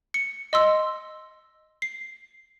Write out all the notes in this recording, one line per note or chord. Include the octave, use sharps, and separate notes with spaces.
C#7
D#5 C6 E6
C7